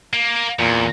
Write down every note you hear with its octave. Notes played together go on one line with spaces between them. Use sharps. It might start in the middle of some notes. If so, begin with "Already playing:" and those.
A#3
E2 A#2